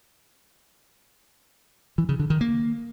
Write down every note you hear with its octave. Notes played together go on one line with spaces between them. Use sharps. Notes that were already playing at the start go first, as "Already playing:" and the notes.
E3
C#3
D3
D#3
A#3